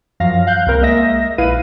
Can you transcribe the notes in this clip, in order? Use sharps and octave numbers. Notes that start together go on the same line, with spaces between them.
F#2 F3 F#3 F5 A#6
F5 F#6 G6
C2 A#3 C4 A#4
G#3 A#3 D#5 E5 A#6
A#1 E4 B4 F5 D#7